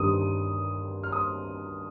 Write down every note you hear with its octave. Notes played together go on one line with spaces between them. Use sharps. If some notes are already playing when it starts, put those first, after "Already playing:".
Already playing: G2 D#3 G3 D#6
F6
D#6